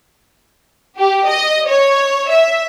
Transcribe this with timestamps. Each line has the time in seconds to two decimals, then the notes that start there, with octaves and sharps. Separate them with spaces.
0.98 G4
1.27 D#5
1.69 C#5
2.30 E5